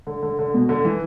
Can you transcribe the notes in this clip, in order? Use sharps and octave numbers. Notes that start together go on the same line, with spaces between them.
D3
D3
D3
B2
D3
E3